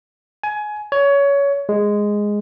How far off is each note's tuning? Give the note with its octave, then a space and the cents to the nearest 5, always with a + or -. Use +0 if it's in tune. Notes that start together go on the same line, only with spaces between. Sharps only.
G#5 +20
C#5 +20
G#3 -5